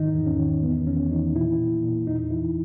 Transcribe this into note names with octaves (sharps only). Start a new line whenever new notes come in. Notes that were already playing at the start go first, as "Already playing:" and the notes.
Already playing: G#2 D#3 D#4
E2
C#4
D#3
E2 B3
E2 C#4
E3 D#4
A#2 E4
A#2
A#2
E2 D#4
E3 E4